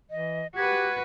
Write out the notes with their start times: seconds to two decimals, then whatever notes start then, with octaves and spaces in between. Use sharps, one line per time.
0.11 E3 D#5
0.56 F#4 G4 B4 G#6